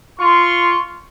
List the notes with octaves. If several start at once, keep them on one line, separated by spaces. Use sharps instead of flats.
F4 C6 C#6